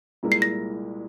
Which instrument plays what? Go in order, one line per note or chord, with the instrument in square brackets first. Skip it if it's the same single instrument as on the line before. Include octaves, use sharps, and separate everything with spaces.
[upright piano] C2 A#2 G#3 E4 A#4
[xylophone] C7
A#6